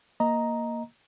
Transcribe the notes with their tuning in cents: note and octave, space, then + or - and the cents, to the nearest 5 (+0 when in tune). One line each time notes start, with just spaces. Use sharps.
A#3 +0 D#5 +5 A#5 +0